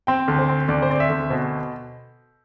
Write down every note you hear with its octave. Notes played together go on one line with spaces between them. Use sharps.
C4 G5
D2
C5
C4
D2 D5
C5
C4 D5
E5
D2
B2 C5